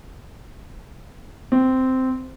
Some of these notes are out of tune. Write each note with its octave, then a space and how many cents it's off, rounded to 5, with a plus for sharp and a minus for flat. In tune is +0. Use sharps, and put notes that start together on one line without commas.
C4 -10